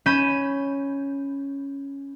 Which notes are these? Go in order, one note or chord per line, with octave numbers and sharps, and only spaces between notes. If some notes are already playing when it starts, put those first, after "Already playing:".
C#4 B5 G6 D#7 E7